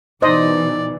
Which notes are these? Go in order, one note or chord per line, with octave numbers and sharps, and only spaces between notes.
B2 E3 D#4 C5 D5 D#5